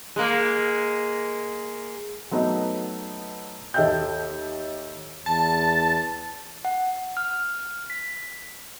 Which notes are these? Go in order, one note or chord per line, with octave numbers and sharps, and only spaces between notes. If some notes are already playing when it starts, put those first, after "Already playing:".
G#3 A#3
F#3 A3 B3 D#4
D#2 A4 D#5 E5 G5 G6
E2 A5
F#5
F6
B6